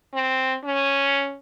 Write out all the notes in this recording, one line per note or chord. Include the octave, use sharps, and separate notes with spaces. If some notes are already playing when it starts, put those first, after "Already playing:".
C4
C#4